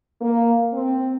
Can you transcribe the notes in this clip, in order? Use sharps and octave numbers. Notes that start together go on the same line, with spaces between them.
A#3
C4